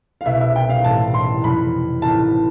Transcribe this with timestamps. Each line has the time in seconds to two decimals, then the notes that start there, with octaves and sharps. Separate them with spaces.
0.21 F5
0.24 C2 B2 B3 E4 G4 E5
0.41 E5
0.56 G5
0.70 F5
0.82 A1 A2 E3 A3 C4 A5
1.14 C6
1.42 F2 C3 F3 B3 E4 B5
2.02 A1 A2 E3 B3 F4 A5